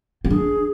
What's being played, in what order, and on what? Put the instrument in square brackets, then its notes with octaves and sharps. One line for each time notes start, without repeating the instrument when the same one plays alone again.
[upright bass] C4 [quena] G4
[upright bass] D4 [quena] G#4